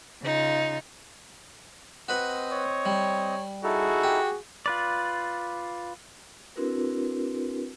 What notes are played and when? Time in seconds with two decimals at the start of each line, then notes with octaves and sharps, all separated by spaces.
0.22 C#3 D#4 F4
2.09 C4 F#4 B4 D#5 F#5
2.52 C#5
2.86 G3
3.64 D#4 E4 F#4 G#4 A4
4.03 G4
4.66 F4 B4 D5
6.56 C4 D4 E4 F#4 A#4 B4